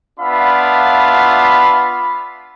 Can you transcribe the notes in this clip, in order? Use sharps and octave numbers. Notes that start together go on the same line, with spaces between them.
B3 D4 F4 E5 F5 B5